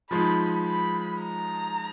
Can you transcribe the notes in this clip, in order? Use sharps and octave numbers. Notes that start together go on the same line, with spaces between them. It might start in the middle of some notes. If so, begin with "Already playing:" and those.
F3 G#3 D#4 B5
B5
A#5